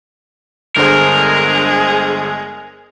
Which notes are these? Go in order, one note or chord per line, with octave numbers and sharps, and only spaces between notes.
G1 D3 G#3 G#4 A#4 C5